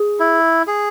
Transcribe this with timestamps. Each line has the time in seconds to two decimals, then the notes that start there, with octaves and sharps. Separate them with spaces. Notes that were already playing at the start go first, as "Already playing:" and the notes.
Already playing: G#4
0.20 E4
0.67 G#4